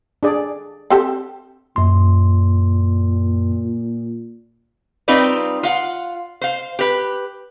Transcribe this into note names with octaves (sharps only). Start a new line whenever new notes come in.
D4 G#4 D5
C4 G4 A4
F#2 A#2 C6
G3 C4 D#4 F4 B4 D5
F4 F5 F#5
C5 F5
G4 B4